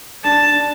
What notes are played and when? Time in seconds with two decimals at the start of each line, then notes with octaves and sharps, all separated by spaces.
0.24 D4 A5
0.52 D4